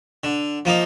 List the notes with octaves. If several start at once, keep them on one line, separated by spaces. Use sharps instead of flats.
D3
F3 A#3 D#4